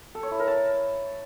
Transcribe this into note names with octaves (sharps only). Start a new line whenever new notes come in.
A4
C#5
E4
A#4
A5